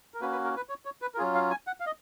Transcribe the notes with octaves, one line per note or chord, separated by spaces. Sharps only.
A#4
A#3 C#4 F#4 B4
B4
A#4
B4
C#5
C#5
B4
A#4
F#3 C#4 F4 G#4
F5
G#5
F#5
F5
D#5